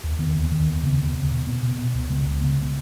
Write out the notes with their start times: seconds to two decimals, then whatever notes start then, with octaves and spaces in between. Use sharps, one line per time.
0.03 D#2
0.19 D#3 B3
0.35 D#2
0.52 D#3 B3
0.67 D#2
0.83 C#3 B3
0.98 D#2
1.14 C#3 B3
1.31 B2
1.47 B3
1.63 B2
1.78 B3
1.94 C#2
2.10 C#3 G#3 B3
2.26 C#2
2.41 C#3 G#3 B3